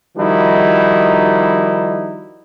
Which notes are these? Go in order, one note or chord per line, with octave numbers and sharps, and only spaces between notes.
D#3 F3 G3 D#4 E4 F#4